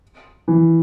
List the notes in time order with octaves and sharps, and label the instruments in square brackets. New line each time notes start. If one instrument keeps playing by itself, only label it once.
[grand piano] E3